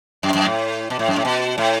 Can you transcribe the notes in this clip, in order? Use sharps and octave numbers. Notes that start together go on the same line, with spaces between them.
F#2
F#2
A2
B2
A2
F#2
A2
B2
A2